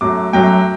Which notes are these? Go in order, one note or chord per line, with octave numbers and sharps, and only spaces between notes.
F#2 F#3 A3 D6
F#2 F#3 A3 G5